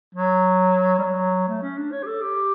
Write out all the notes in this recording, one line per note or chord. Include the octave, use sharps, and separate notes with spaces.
F#3
G3
F#3
A3
C#4
D4
C#5
G4
A4
G4